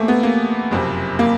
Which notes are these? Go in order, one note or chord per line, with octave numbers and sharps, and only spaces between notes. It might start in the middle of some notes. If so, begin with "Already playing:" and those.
Already playing: E2 C3 A3 A#3
B3
A#3
F#1 F2 C3
A#3